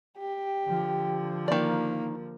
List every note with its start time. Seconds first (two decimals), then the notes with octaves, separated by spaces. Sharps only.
0.18 G4
0.65 D3 F3
1.48 D#3 A#3 D5